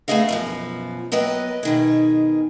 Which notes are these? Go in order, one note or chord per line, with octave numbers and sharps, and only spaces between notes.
A3 B3 C#4 G#4 D#5 F5
F#2 B2 F3
F#3 B3 B4 D#5 G5
B2 D#3 G#4